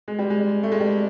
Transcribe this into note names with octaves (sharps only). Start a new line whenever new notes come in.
G#3
G3
G#3
A3
G#3
G3